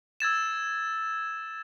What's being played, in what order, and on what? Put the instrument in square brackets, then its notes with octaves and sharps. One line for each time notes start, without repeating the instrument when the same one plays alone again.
[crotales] E6 G#6 A6 E7